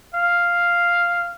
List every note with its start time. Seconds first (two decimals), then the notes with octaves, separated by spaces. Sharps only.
0.14 F5